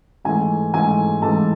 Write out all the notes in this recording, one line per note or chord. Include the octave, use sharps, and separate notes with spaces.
G#2 E3 A3 G#5
G#2 E3 A3 G#5
G#2 E3 A3 A4 A5